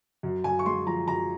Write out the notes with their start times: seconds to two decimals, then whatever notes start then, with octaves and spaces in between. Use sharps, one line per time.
0.23 F#2
0.44 F#2 G#5
0.59 C#6
0.66 G#3 C6
0.86 F3 A#5
1.08 F#2 A#5